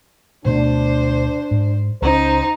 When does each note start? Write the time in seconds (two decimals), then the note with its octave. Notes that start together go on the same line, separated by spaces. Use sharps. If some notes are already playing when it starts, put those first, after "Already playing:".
0.45 D2 B2 A3 D4 C5
1.51 G#2
2.02 C#2 C#4 D#4 C5